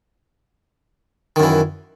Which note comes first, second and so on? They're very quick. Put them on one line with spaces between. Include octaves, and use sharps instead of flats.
D#3 F#2 E3